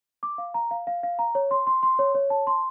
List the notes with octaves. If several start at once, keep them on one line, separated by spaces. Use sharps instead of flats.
D6
F5
A#5
F5
F5
F5
A#5
C#5
C6
C6
C6
C#5
C#5
A5
C6